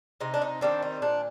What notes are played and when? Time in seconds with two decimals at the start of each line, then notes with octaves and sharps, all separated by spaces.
0.20 C3 D#4
0.34 D4
0.42 D#4
0.61 D#3 G3 C4 D4
0.82 D#4
1.02 A#2 D4